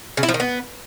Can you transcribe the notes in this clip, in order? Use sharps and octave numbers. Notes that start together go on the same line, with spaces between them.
C#3
E4
F3
D#3
B3